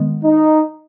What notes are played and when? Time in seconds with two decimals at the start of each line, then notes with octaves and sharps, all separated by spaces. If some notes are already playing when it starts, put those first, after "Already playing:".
Already playing: D#3 G#3 B3
0.24 D#4